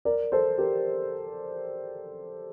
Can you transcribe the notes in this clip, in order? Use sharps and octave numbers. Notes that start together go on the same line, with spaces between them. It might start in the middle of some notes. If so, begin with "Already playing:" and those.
A#4 D5
A4 C5
G4 A#4